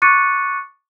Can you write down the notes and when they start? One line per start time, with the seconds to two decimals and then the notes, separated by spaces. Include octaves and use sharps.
0.02 C#6 D6 F#6 A6 C#7 D#7